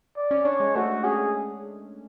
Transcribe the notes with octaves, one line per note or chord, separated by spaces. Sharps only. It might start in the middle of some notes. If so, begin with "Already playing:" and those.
D5
C#4
D4 C#5
G#3
A3 F#4
C#4 G#4